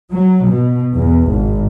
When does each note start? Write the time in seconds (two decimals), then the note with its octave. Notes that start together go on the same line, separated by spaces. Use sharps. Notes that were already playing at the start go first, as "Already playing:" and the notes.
0.13 F#3
0.47 B2
0.97 E2
1.30 G#1